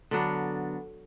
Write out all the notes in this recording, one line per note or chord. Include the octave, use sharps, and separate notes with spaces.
D3 F#3 B3 D4